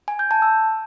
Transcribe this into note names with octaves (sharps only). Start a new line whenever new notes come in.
G#5
G6
A5
E6